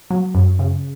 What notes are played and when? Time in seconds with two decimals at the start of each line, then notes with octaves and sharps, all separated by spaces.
0.10 F#3
0.35 F#2
0.59 C#3